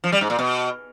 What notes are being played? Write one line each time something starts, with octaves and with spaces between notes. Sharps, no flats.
F3
G3
G#2
A#2
B2